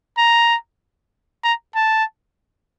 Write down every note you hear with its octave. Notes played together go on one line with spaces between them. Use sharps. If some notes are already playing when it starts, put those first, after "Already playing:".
A#5
A#5
A5